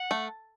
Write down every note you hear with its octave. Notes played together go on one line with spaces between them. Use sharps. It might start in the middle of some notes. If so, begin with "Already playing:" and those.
Already playing: F#5
A3